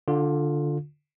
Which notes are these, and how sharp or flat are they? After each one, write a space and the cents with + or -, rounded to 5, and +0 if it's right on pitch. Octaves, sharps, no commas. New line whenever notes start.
D3 +0 F4 +15